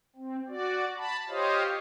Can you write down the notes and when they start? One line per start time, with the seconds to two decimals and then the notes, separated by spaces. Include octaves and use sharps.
0.16 C4
0.48 F#4 D5
0.97 A5 B5
1.29 F4 G4 C5 C#5 D#5 F5